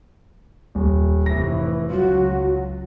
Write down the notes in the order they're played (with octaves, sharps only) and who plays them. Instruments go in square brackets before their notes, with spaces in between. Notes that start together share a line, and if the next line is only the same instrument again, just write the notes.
[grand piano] D#1
[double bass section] F1 A2 E3 [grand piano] A#6
[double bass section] C#2 F#3 [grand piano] F4 [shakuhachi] F#4